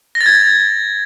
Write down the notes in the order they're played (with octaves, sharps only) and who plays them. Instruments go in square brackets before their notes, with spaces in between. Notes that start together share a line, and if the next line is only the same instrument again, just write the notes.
[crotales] A#6
A6
G#6